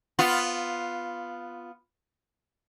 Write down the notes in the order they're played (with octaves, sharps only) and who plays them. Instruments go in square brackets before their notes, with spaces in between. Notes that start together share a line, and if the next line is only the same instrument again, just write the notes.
[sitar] B3 F4